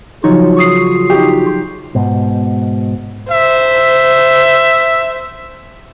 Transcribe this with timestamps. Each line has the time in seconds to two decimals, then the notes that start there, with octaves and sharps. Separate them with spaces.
0.24 C#3 F3 F#3 D#4 F4 F#4 C#5
0.57 C#6 D#6 C7
1.10 D#4 G4
1.95 G#2 B2
3.31 C5 E5